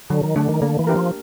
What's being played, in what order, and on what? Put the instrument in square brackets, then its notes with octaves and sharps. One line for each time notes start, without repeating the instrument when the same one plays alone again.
[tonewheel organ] D3 [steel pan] F#3
[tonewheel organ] D#3
[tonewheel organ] D3 [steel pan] A3 D4
[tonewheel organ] D#3
[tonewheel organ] D3 [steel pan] A#3
[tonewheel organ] E3
[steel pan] D4 G4 A#4
[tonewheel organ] F3